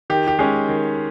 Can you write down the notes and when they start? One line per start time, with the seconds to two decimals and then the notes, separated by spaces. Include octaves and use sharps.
0.10 D#3 G4
0.28 G4
0.39 G#3 C#4 G#4
0.68 D#3